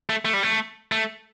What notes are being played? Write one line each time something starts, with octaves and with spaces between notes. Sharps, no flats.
A3
A3
G3
A3
A3